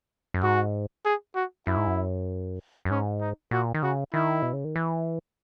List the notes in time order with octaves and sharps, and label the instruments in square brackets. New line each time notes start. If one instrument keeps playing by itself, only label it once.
[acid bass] F#2
[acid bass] G#2 [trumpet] F#4
[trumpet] G#4
F#4
[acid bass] F#2 [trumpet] E4
[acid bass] G#2
F#2
F#2
[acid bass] G#2 [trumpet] C#4
[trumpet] D#4
[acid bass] A#2 [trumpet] F#4
[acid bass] D#3
[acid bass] C#3 [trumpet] F#4
[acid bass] D#3 [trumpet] E4
[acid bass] B2
C#3
D#3
E3